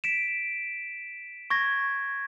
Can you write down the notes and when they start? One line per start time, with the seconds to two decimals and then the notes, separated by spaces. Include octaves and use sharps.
0.04 B6 D7 E7
1.50 C#6 G#6 A#6